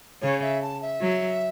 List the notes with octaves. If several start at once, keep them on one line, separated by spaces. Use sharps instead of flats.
C#3 C#5
E5
A5
E5
F#3